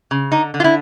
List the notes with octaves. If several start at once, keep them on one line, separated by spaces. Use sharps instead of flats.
C#3
D3 D#4
D3
F4
E4